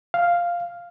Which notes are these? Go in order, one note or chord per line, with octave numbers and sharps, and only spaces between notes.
F5